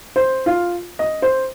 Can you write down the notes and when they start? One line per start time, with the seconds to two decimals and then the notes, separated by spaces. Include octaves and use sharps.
0.16 C5
0.46 F4
0.99 D#5
1.22 C5